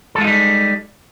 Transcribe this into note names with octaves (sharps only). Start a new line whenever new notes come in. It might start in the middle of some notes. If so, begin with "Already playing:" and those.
G3 G#3 D#4 F4 A4